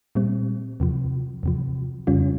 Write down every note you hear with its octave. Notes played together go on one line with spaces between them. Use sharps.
A#2 G3 C4
E2 C3 F3
E2 C3 F3
F2 C#3 G3 C#4 F4